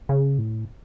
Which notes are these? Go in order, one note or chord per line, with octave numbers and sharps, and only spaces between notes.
C#3
A2